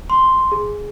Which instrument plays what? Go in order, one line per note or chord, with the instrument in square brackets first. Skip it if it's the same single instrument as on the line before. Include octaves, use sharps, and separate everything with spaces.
[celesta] C6
G#4